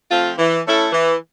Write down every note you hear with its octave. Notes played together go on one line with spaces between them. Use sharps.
F3 A3 C4 F4
E3
A3 C#4 E4 A4
E3